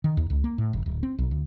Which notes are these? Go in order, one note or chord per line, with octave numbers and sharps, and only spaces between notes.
D#3
D#2
C#2
A#3
A2
F#1
D1
C4
B1
D2